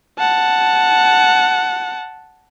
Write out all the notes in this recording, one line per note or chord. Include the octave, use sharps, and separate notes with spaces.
F#5 A5